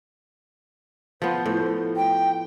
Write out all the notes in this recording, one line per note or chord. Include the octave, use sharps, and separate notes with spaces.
F3 B3 C5
A2
G5